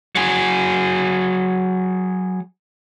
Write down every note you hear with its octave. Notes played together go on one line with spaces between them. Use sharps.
F#3 G#4